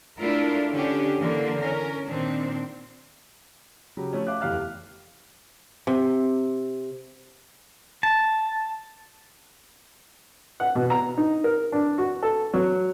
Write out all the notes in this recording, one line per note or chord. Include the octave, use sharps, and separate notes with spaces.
A3 D4 E4 F4 A#4
D3 C#4 D4 G4
D3 E3 A#3
C#4 A#4
A#2 D#3 C4 D4
C#3 F#3 G4
F3 A3 C#4
E5 F5 D6 F#6
F1 E2 G4 F5 F6 F#6
C3
A5
F#5
B2
A#5
D#4
A#4
D4
F#4
A4
F#3